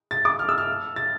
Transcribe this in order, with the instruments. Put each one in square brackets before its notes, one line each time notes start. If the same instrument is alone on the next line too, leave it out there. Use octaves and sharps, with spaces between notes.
[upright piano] A6
D6
F6
E6
F6
A6